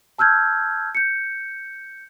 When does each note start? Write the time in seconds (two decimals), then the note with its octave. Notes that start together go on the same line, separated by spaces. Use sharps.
0.18 A5 E6 F6 G6 G#6
0.95 G6 C#7